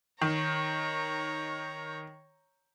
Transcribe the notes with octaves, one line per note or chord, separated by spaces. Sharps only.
D#3 C#5 A#5